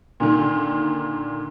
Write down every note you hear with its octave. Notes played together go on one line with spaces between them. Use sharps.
A#2 D3 D#3